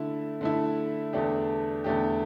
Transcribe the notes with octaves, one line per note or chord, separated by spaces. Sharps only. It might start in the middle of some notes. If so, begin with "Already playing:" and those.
Already playing: D3 A3 E4
D3 A3 E4
E2 D3 A3 D4 G4
E2 D3 A3 D4 G4